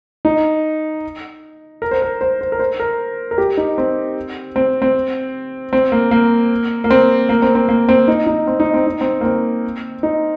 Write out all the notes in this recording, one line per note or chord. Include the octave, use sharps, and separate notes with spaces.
D#4
A#4
C5
A#4
C5
C5
A#4
C5
A#4
A#4
G4
D#4
C4
C4
C4
C4
A#3
A#3
A#3
C4
A#3
C4
C4
A#3
C4
D#4
D#4
C4
D#4
C4
D#4
C4
A#3
C4
D#4